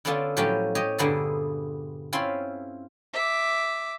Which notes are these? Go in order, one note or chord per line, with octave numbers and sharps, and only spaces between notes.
D3 B3 C#4 D4 F4 A4
A2 F3 F#3 C#4 G4 G5
G4 C#5 D#5
G2 A#2 D3 B3 G#4 A4
C4 C#4 E4 F4 B5 C6
E5 D6